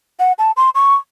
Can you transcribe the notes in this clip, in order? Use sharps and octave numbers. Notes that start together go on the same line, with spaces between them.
F#5
A5
C6
C#6